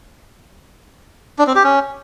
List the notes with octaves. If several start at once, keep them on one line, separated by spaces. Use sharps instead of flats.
D4
C4
G4
C#4